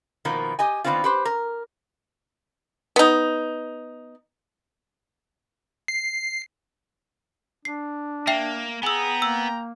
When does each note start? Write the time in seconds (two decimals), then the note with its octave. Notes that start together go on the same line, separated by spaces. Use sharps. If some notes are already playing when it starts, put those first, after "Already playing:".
0.25 B2 D#3 F3 A#3
0.59 G4 D#5 G#5
0.84 D#3 E3 B3 C4 D4 F4
1.04 G4 B4 C5
1.25 A#4
2.96 B3 D#4
5.88 C7
7.65 D4 C7
8.27 A#3 E5 G5 C7
8.83 B3 G#4 G5 G#5 A#5 E6
9.22 A#3 E6